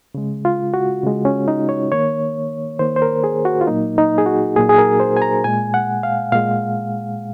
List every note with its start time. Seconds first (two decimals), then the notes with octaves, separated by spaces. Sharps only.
0.15 C#3 G#3
0.45 F4
0.74 F#4
1.03 C#3 G#3
1.25 C#4
1.48 D#4
1.69 C#5
1.92 D#3 A#3 C#5
2.79 D#3 A#3 C5
2.96 C5
3.02 A#4
3.24 G#4
3.45 F#4
3.61 F4
3.67 A#2 F#3 A#3 D#4
3.98 D#4
4.18 G#4
4.26 F#4
4.56 A#2 F#3 A#3 G#4
4.69 G#4
4.78 A#4
5.00 C5
5.17 G#5
5.22 A#5
5.44 A#2 G#3 G#5
5.74 F#5
6.03 F5
6.32 A#2 G#3 F5